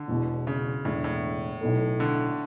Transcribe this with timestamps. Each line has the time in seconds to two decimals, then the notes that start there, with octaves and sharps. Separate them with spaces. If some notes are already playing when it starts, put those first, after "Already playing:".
Already playing: D3
0.08 E1 E2 B2
0.47 C#3
0.85 E1 E2 A2 D3
1.04 A2
1.61 B1 B2 A3 E4 A4
2.00 D3